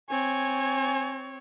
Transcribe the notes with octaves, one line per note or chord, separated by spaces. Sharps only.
C4 C#5 G#5